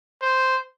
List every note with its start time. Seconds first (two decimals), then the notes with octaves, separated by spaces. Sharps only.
0.22 C5